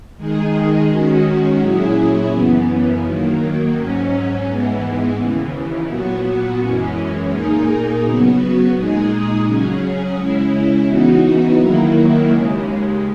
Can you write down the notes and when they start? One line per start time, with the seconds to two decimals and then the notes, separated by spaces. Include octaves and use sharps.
0.17 D#3 G#3 D#4 G#4
0.88 D#3 G#3 C#4 F#4
1.61 A#2 F#3 C#4 E4 G#4
2.31 F#2 C#3 E3 B3
3.02 D#3 F#3 A#3
3.74 G#2 F#3 C#4
4.45 G#2 E3 G#3 B3
5.17 D#2 C#3 E3
5.87 A#2 F#3 B3 F#4
6.59 F#2 E3 G#3 C#4
7.30 A#2 A#3 D#4 G#4
8.02 C#3 F#3 B3 F#4
8.73 A#2 G#3 D#4 G#4
9.45 C#3 F#3 C#4 G#4
10.16 C#3 G#3 C#4 E4
10.87 C#3 E3 B3 D#4 F#4
11.58 D#3 F#3 A#3 E4
12.30 D#2 C#3 G#3